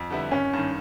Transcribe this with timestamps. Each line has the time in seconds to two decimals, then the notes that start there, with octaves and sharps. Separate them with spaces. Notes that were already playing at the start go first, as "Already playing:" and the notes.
Already playing: F2
0.10 D3 G3 B3 E4
0.31 G#1 C#4
0.53 G2 D#3